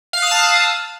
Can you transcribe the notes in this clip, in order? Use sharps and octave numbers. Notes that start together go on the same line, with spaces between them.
F5 A5 D#6 E6 F#6